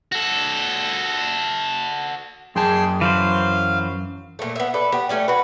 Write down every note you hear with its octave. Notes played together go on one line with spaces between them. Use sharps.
F#4 A4
F#2 G#4 G5 A5 C6
E3 F#3 C5 F5
A#2 A3
B3 E5
A4 B4 D5
B3 G4
A3 C#4 D5
F#4 B4